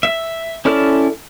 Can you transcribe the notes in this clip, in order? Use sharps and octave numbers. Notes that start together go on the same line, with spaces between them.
E5
C#4 E4 A4 D5 F6